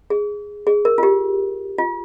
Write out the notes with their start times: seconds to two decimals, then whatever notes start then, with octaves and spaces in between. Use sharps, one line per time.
0.10 G#4
0.67 G#4
0.85 A#4
0.98 F4
1.03 G4
1.78 F4